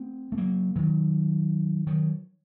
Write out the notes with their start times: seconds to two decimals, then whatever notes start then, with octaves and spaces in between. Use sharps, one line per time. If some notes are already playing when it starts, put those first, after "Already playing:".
Already playing: A3 C4
0.32 A3
0.38 F#3 A#3
0.76 D#3 F#3
1.87 D#3 F#3